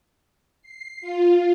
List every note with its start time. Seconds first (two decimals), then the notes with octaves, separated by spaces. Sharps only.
0.62 C7
1.01 F4